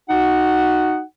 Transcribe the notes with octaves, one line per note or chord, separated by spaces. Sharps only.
D#4 F#4 F#5